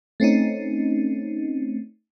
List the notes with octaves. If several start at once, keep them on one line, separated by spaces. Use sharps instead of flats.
A3 C4 C#4 D#4